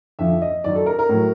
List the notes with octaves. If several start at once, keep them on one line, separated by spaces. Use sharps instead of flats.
F2 D3 F3 E5
D#5
F#2 D#3 F#3 D5
A4
A#4
A#4
A2 F#3